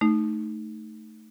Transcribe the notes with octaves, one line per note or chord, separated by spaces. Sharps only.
A3 D#4